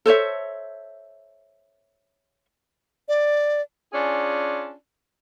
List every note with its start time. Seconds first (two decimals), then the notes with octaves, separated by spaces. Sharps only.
0.06 A4 C5 C#5 E5
3.08 D5
3.93 C#4 D4 F4 G#4